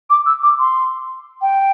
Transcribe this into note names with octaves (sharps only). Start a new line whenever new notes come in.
D6
E6
D6
C6
G5